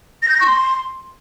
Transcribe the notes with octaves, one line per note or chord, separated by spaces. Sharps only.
A#6
G6
A#6
C#6
C6